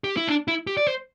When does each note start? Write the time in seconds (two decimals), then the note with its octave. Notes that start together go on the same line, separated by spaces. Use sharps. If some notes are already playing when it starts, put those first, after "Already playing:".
0.04 G4
0.17 E4
0.28 D4
0.48 E4
0.67 G4
0.77 D5
0.87 C5